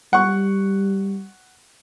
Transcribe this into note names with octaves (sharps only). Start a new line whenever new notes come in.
G3 F#5 C#6